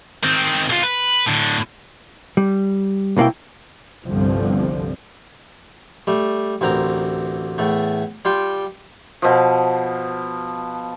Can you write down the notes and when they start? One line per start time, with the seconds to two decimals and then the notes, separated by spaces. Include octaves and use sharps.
0.23 D#3 C4
0.69 B1 F4
0.83 B4
1.26 A2 D3
2.37 G3
3.17 C2 B2 A#3 E4 G5
4.06 G1 C2 G2 D3 F3 C4
6.07 G3 A3
6.61 A1 D2 C4 A#4 A#5
7.58 E2 A2 A3
8.25 G3 F4 G5 C6
9.22 B2 F3